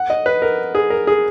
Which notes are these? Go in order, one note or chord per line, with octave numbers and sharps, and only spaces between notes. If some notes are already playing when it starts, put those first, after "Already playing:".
Already playing: F#5
D#5
B4
A#4
G#4
A#4
G#4